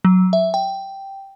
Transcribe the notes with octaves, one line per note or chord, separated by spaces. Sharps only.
F#3
E5
G5